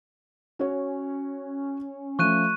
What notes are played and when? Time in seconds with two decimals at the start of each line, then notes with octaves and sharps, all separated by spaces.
0.59 C#4 F#4 C#5
2.19 F3 A3 C#6 F#6 D#7